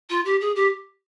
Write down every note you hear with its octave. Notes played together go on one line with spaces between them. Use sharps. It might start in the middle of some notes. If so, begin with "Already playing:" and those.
F4
G4
G#4
G4